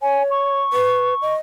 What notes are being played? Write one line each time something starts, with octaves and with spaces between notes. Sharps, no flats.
C#5 G#5
C#6
B4
D#5